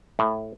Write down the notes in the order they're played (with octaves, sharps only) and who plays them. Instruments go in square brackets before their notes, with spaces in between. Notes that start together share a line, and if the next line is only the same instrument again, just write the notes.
[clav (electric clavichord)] A2